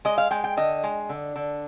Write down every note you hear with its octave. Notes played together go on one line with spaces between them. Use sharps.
G#3 D#5
F5
G#3 G5
G5
D3 D#5
G#3
D3
D3